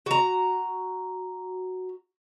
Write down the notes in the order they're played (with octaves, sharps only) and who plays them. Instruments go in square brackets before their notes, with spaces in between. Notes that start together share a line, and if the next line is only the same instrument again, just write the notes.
[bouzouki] F#4 A#5